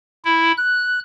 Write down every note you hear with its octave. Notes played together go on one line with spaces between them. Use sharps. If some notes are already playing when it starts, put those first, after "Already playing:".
E4
F#6